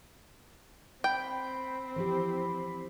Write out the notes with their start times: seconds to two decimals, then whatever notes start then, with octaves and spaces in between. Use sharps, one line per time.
1.04 C4 G5 B5
1.96 E3 F3 G4